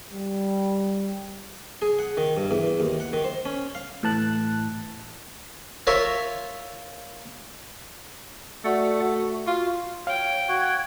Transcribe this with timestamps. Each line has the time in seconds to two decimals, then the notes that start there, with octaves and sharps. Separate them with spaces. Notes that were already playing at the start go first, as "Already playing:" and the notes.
0.11 G3
1.82 G#4
1.99 F#5
2.17 D#3
2.37 G2
2.51 E2
2.80 D#2
3.00 F#5
3.13 D#3
3.24 C5
3.45 C#4
3.75 F5
4.03 A2 E3 A5 F#6
5.87 F4 A#4 C#5 E5
8.65 A3 F#4 D5 F#5
9.01 F#4
9.47 F4 F#4
10.07 C#5 F5 G5
10.49 F#4 G#6